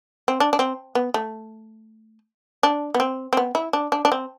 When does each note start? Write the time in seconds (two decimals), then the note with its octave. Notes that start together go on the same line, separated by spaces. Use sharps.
0.28 C4
0.40 D4
0.53 D4
0.59 C4
0.95 B3
1.14 A3
2.63 D4
2.94 B3
3.00 C4
3.33 C4
3.37 B3
3.55 E4
3.73 D4
3.92 D4
4.05 D4
4.12 C4